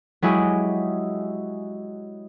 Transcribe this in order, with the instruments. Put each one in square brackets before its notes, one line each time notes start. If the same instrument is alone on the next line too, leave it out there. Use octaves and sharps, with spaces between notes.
[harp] F#3 G#3 E4 G4 G#4